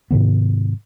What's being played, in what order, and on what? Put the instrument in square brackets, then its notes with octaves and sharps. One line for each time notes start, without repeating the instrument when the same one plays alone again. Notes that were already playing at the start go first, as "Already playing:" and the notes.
[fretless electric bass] G#2 C3 D#3 B3